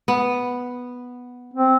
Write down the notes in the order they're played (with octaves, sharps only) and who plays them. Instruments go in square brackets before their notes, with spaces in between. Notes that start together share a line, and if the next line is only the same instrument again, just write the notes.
[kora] B3
[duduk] C4